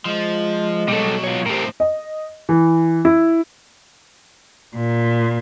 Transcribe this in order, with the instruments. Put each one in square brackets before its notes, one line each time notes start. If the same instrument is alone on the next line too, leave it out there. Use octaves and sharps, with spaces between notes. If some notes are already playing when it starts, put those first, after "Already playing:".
[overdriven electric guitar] F3 [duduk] G#3
[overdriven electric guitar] B2 F#3 [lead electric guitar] G3 A4
[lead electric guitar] F4 C#5
[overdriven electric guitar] A2 C4 [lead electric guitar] G4 A#4
[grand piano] D#5
E3
E4
[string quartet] A#2